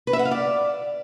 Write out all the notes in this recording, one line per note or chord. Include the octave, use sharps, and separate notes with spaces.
B4
E5
F#5
F5
D5